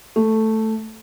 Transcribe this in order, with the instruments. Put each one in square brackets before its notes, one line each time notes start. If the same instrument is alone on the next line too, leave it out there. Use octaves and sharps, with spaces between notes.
[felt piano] A3